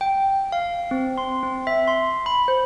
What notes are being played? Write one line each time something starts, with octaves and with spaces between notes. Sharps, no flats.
G5
F5
C4
C6
C4
E5
C6
B5
C5